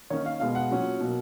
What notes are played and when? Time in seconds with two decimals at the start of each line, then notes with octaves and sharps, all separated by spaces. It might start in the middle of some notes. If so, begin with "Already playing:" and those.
0.10 D#3 A#3 C#4 C#5
0.26 F5
0.40 B2 G#3 B3 F5
0.55 F#5
0.71 A#2 F#3 C#4
1.00 B2 F#3 A#3